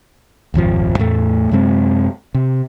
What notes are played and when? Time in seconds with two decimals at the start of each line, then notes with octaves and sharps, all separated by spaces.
0.54 D#1 G#1 F2 F3
0.98 E2 A2 A3
1.51 F#2 C3 G#3 C4
2.34 C3